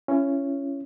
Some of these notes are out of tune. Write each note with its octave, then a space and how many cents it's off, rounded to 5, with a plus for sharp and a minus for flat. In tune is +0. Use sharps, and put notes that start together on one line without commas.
C#4 +0 E4 +35 C#5 +0